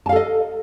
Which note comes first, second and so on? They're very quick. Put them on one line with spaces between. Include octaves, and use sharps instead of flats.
A5 F5 A4 D#5